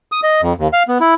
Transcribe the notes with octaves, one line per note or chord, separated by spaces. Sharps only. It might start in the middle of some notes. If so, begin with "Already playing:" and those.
D#6
D#5
F2
D#2
F5
B3
E4